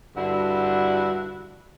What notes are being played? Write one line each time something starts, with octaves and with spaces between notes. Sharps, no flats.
G2 D3 D4 E4 F#4 F#5